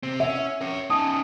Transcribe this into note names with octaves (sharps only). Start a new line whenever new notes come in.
C3 C4
C#4 E5 F#5
C#4 A#4 C#5
C#4 D#4 G5 A5 D#6